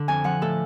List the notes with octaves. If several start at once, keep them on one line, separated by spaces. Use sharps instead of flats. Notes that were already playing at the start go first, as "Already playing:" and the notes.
Already playing: D3
F2 G#5
F3 F#5
A2 A4